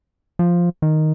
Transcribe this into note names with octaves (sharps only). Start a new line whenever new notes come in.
F3
D#3